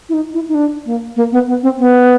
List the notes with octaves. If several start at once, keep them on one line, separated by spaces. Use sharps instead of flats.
E4
D#4
E4
D#4
D4
A#3
A#3
B3
B3
C4
B3